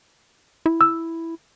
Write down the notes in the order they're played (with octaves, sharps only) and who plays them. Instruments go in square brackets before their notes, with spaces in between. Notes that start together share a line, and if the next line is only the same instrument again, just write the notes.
[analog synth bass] E4
[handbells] E6